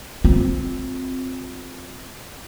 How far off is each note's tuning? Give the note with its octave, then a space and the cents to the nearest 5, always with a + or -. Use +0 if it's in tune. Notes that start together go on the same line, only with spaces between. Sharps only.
C4 +0 F4 +35